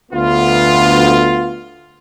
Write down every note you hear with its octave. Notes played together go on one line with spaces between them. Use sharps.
D2 B3 F4